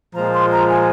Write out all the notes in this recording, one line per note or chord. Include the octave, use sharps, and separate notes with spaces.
A#2 F3 G#3 A#5
C6
A#5
G#5